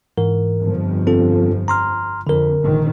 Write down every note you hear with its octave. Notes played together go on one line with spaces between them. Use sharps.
G#2 E3 A#4
G1 F2 F3
C4 F4 A4
A#5 C6 F6
F2 D3 A#4
A#1 G#2 D#3